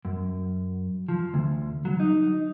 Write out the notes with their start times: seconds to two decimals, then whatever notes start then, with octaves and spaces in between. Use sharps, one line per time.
0.05 F#2
1.09 F3
1.34 D2
1.85 F#3
2.00 D#4